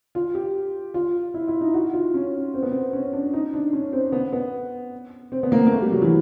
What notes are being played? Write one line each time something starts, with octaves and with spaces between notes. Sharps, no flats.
F4
G4
F4
E4
E4
D#4
F#4
F4
C#4
C4
B3
C4
C#4
D4
D#4
D4
C#4
C4
B3
B3
C4
B3
A#3
A#3
A3
G3
F#3
E3